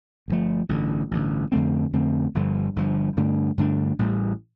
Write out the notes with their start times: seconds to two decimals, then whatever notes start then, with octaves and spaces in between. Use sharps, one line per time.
0.28 G1 F2 F3 A3
0.69 A1 G2 D3
1.11 A1 G2 D3
1.52 F2 D3 A3 C4
1.93 F2 D3 A3 C4
2.35 G1 G2 D3 F3
2.76 G1 G2 D3 F3
3.17 G2 D3 A3 D4
3.58 G2 D3 A3 D4
3.99 A1 A2 G3